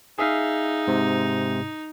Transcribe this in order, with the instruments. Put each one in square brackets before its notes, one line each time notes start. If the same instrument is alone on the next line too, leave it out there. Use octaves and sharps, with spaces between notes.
[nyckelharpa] D#4 [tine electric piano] G#4 E5 F5
[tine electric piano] G#2 C3